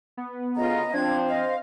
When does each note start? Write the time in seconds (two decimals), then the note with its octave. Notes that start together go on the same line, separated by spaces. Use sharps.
0.17 B3
0.57 D2 C#3 F4 D#5 A#5
0.93 F3 C4 D4 G#6
1.29 C5 D#5 F5